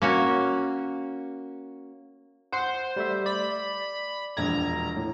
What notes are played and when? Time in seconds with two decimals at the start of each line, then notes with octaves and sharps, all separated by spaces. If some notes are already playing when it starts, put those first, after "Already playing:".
0.02 A#3 C#4 F#4
2.52 C5 F#5 C6
2.96 G3 A3 E5
3.26 D5 B5
4.37 E1 A#1 A#5 G#6
4.97 A2